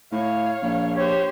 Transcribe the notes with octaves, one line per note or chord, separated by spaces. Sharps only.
A2 C#5 F5
A#1
G4 C5 C#5